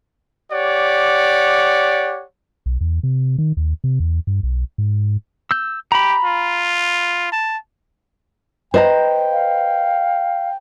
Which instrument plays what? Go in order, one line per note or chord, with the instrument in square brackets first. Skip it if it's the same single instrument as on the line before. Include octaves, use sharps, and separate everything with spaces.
[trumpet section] G4 C#5 D5 F#5
[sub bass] B1
E2
C3
D#3
D#2
C3
E2
G2
B1
G#2
[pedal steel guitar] E6 G6
[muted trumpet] G4 [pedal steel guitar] A#5 B5
[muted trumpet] F4
A5
[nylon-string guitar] B4 [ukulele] C5 D#5 A#5 [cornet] G5
[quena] F5